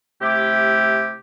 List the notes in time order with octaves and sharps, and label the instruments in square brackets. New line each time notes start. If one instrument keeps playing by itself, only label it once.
[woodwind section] C3 A3 E4 G4